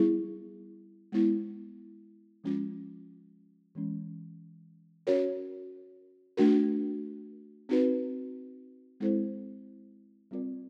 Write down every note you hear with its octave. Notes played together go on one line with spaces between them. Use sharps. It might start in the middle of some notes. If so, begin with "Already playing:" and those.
Already playing: G3 B3 E4 G#4
G#3 B3 E4
F3 G#3 C#4 F4
E3 G#3 C#4
C#4 F#4 A#4 C#5
A3 D4 F#4 A#4
C4 D#4 F#4 B4
G#3 C4 E4 A4 C5
G3 C4 F4 A#4 D5